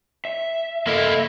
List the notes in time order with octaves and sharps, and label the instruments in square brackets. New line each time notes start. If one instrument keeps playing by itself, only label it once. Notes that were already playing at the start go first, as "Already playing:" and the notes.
[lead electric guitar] E5
[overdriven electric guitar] A#3 E4 [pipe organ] A4 D#5